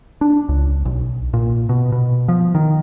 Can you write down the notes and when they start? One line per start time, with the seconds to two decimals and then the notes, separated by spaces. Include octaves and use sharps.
0.21 D4
0.49 C#2
0.85 B1
1.33 A#2
1.69 B2
1.92 B2
2.28 F3
2.55 D#3